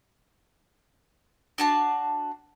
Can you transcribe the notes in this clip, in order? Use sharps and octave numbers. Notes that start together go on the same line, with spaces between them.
D4 F#4 A5